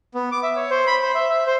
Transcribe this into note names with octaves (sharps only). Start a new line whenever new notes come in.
B3
D6
E5
C#5
C5
B5
C5
E5
E5
C5